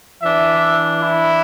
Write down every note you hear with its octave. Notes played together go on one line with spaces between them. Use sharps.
E3 D4 E5
E4